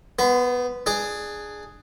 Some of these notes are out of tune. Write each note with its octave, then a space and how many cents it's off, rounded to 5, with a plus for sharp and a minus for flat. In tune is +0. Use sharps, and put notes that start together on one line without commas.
B3 +0 C5 -40
D4 +20 G#4 +0